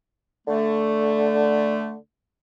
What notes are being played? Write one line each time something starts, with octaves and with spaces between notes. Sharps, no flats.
D3 A3